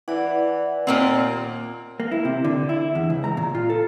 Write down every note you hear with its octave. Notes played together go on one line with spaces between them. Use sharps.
E3 E4 B4 D5 F#5
D#2 A#2 A#3 C4
A#3
E4
C3
D3
E4
E2
C#2
A#5
A#2
F4
A4